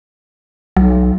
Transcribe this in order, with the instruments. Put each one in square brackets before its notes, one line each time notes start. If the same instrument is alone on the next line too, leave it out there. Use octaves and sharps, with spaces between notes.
[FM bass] B1 [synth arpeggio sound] F#3